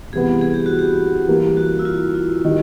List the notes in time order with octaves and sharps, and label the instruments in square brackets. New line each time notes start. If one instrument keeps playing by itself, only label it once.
[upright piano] C3 E3 G3 B3 [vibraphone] G#4
[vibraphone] G#4
G4
F#4
G4
[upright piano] E3 G3 A#3
[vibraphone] F#4
E4
F4
E4
[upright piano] D#3 G3